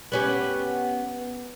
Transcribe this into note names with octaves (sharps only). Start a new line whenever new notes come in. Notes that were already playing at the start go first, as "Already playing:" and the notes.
B3 C#4 G4